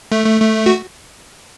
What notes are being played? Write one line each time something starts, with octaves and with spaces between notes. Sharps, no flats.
A3
A3
A3
F#4